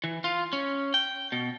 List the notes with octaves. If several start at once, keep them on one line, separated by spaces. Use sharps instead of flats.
E3
F4
C#4
G5
B2